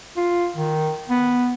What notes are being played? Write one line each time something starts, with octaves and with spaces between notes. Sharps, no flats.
F4
D#3
B3